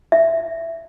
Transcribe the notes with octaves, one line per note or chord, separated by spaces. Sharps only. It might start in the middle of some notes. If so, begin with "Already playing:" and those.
E5